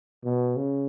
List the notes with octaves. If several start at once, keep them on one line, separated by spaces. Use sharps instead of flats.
B2
C#3